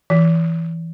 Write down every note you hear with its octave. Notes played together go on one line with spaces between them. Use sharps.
E3